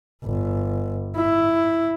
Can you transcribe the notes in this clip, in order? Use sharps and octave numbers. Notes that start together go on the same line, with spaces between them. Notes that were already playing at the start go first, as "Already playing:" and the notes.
G1
E4